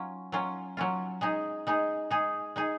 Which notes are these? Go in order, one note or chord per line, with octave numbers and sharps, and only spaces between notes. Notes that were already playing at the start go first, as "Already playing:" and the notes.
Already playing: F#3 C#4 F4
F#3 C#4 F4
F#3 C#4 F4
G#3 D#4 G#4
G#3 D#4 G#4
G#3 D#4 G#4
G#3 D#4 G#4